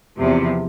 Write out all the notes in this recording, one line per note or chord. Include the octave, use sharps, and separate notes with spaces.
E2 C3 F3